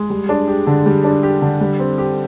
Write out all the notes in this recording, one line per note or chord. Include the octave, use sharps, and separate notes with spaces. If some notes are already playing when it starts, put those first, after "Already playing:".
Already playing: G#3
G3
D4
G4
D3
G3
D4
G4
D3
G3
C4
G4